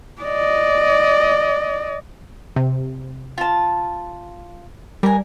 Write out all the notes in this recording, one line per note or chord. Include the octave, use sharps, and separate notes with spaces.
D5 D#5
C3
F4 A5
G3 A#4 G#5